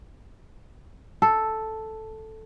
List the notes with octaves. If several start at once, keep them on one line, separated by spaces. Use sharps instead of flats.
A4